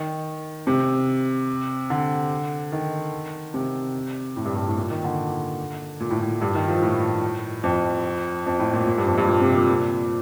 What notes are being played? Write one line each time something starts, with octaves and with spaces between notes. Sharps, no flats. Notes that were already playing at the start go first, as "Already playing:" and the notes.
Already playing: D#3
C3
D3
D#3
C3
A2
G2
G2
A2
A#2
D#3
D3
A#2
A2
A2
G2
D#3
F3
A2
F2
F2
A2
A#2
A#2
G2
F2
G2
A#2
C3
A#2
A#2